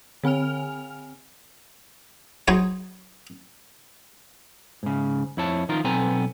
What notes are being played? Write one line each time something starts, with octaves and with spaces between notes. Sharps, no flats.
D3 C4 G#5 F6 F7
F#3 D#4 G#4 C5 C#5
G#2 C#3
F2 E4 C#5 A5
D#3 F3 D#4 F4 A#4
B1 B3 C4 A4 G#5 A#5